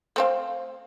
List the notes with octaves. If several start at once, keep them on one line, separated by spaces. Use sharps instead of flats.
A3 C4 F5